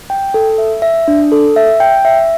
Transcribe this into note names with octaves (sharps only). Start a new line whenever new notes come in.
G5
A4
E5
E5
D4
A4
E5
G5
E5